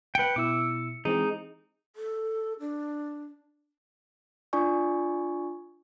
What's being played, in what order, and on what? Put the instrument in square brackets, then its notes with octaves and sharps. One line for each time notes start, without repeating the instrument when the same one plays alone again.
[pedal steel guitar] B4 G5 [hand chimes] C#7
[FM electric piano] B2 E4 [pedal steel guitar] D6 E6
[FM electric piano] E3 G#3 C4 [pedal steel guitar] D#4 [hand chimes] G#4
[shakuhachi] A4
D4
[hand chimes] D4 F4 D5 G#5 C#6